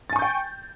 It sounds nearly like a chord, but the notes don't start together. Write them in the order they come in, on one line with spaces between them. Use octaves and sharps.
A6 G#5 C#6 G6 G5